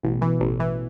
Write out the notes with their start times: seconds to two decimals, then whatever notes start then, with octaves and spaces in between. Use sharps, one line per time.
0.03 A1 B2
0.22 E3
0.40 A1
0.60 E3